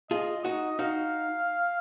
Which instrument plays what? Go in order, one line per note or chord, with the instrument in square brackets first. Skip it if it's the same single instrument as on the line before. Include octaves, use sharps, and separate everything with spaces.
[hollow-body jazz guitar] F4 G#4 [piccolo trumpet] D#5
[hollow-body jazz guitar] D#4 F#4 [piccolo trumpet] D#5
[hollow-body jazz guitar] D#4 F#4 [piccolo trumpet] F5